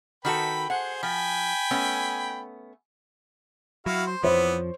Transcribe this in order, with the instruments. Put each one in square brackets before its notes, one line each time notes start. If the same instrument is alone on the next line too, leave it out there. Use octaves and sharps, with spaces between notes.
[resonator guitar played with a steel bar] D#3 F#4 A4 [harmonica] B4 G5 B5
[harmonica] G#4 C5 [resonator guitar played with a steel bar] F#5
[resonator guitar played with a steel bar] F3 [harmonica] G5 G#5 B5
[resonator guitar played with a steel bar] A3 B3 C#4
[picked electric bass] F#3 [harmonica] E4 F#4 F5
[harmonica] C5
[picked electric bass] F2 F3 [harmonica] E3 B3 [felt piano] C5 C#5